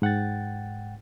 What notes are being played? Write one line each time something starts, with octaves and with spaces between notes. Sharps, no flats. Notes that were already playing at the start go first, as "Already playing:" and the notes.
G#2 F#5 G5 A6